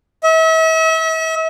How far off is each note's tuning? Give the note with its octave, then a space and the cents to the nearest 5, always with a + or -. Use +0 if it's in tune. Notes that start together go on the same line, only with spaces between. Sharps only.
E5 -40